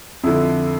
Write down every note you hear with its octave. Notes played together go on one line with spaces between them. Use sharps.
F2 D3 E4